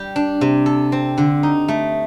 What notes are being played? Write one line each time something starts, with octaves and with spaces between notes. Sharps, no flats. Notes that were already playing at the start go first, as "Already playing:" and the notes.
Already playing: G3 G4
D4
C3
A4
C4
D3
D#4
A3